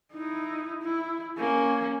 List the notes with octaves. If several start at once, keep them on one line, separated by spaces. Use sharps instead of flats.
D#4 E4
E4
A#3 C#4